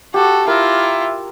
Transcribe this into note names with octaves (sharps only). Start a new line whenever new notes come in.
F#4 G4 A4
E4 F4 A#4 E5